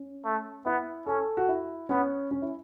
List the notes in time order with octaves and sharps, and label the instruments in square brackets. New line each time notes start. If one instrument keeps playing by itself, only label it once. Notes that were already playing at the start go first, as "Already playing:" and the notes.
Already playing: [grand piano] C#4
[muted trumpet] A3
[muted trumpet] B3 [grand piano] E4
[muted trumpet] C#4 [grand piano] A4
[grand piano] F#4
E4
[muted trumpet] B3 [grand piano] C#4
[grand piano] C#4
E4